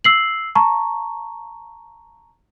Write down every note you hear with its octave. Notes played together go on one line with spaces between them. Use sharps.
E6 C7 F#7
A5 A#5 C#6